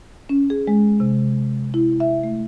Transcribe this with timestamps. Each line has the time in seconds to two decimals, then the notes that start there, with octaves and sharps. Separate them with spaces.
0.29 C#4
0.50 G#4
0.68 G#3
1.00 C3
1.74 E4
2.00 E5
2.24 A3